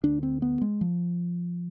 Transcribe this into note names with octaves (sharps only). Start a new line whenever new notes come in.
D2 D3 D4
C4
B3
G#3
F3